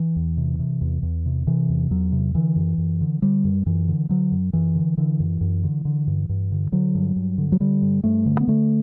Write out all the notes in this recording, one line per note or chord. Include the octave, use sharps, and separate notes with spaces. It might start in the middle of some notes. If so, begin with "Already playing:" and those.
Already playing: E3
E2
C3
C3
E2
E2
C3
C3 E3
E2
E2 F#3
C3
D3 E3
F#2
F#2
D3
D3 G3
F#2
F#2 E3
D3
D3 F#3
F#2
F#2 E3
D3
D3 E3
F#2
F#2
D3
D3
G2
G2
D3
D3 F#3
G2
G2
D3
F#3
D3 G3
G2
G2 A3
D3
B3
D3 A3